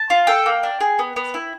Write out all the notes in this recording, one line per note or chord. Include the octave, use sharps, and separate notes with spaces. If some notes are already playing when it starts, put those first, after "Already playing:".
Already playing: A5
F4
A4 G5
A#3
D4
G#4
B3
B3
E4